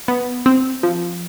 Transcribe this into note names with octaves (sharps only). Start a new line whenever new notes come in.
B3
C4
F3